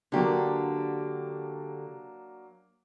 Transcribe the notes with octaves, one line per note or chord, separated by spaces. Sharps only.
D3 F#3 A#3 D4 G4